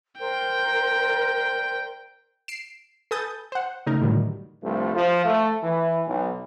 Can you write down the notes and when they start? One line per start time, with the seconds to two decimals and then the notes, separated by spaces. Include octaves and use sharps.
0.19 A#4 C5 D5 G5
2.48 C7 D7 E7
3.11 A4 B4 G#5 D#6 G6 A6
3.52 C5 F#5
3.87 C#3 A3 D#4 A#4
4.02 A2 D3 D#3 F#3 G3
4.62 C2 G2 F3 A3
4.95 F3
5.24 A3
5.63 E3
6.07 B1